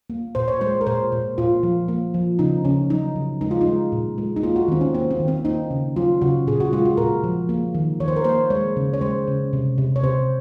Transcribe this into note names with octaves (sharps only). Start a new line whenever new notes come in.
A#3
A#2 C5
C#5
G#3 C5
A#4
A#2 C5
A#2
A#2 F4
F3
A#3
F3
C#3 D#4
C#3 C#4
F#3 D#4
C#3
G#3 D#4
F4
D#4
G#3
A#2
G#3
D#4
A#3 F4
F#4
D#3 C4
C#4
A#3 C4
C4
D#3
C4
A#3 D#4
C#3
F#3 F4
C#3 F#4
A#2 G#4
F#4
G#3 F4
F#4
A#2 A#4
F3
A#3
D#3
D#3 C#5
C5
A#4
A#3 C5
G#3 C#5
C#3
C#5
G#3 C5
C#3
C3
C3
C#5
C3 C5